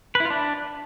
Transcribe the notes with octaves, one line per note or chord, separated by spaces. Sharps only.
B4
E4
F4
D4